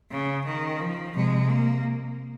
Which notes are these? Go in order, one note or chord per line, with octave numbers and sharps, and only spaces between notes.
C#3
D#3
F3
C3 G#3
A#3